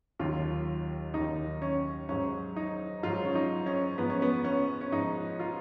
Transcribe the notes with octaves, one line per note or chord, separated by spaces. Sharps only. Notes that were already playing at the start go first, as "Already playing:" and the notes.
D#2 D#3 F#3 F4
D#2 D#3 F#3 D#4
C#4
G#2 F#3 C#4
D#4
G#2 F#3 F4
C#4
D#4
C#4
G#2 F3 B3
C#4
B3
C#4
C#4
G#2 F3 D#4
F4